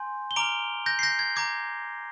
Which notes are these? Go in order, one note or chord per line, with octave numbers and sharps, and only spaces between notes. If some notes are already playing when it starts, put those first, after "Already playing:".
Already playing: G#5 C6 G6
G7
A#5 D6 F6 D7 F7
G6 A#6
C7
G6 A#6
G#6
A#5 D6 G6 G#6